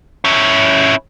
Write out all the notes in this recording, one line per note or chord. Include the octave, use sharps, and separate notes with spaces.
C#4 E4